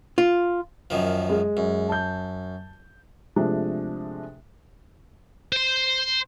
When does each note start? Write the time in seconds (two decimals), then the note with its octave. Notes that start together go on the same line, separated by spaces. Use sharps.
0.18 F4
0.90 F#2 D#3 F3
1.30 G#3
1.57 F#2
1.89 A5 G6
3.36 C3 F3 G#3 A3 D4
5.52 C5 C6